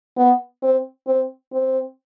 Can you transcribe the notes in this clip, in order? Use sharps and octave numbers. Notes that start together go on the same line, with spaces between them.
B3
C4
C4
C4